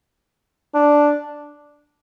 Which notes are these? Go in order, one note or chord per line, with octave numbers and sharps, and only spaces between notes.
D4